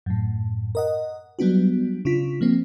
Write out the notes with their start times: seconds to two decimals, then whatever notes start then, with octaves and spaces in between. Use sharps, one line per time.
0.06 F#2 A2
0.75 A#4 D#5 F#5
1.39 F#3 G3 B3 D4 F#4
2.05 C#3 D4 F4 B6
2.41 F3 A#3 C4